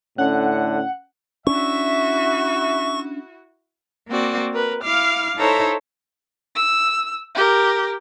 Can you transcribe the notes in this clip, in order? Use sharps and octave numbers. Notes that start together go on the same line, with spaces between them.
A2 D3 C#4 F#5 F#6
C#4 D4 E4 F#4 E5 C#6
A#3 C4 F#4 D5
A#4 B4
E4 F5 D6 F6
D#4 E4 A4 C5 C#5 A#5
E6
G4 A#4